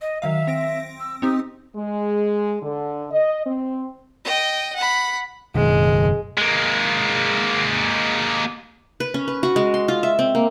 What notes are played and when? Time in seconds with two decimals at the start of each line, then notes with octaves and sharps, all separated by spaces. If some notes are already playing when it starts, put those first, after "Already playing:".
0.01 D#5
0.22 D#3 F#3 E5 F5
0.47 C4 A#6 D7
1.00 E6
1.22 C4 D#4 G4 D#6
1.76 G#3
2.62 D3
3.10 D#5
3.45 C4
4.25 D#5 G5
4.76 F#5 B5
5.55 F#1 B2 D#3 G#3
6.38 G#3 A#3
9.00 B4
9.14 C#4
9.28 B4
9.43 F#4
9.56 G#3
9.74 C6
9.88 F4
10.03 E5
10.19 C4
10.35 A#3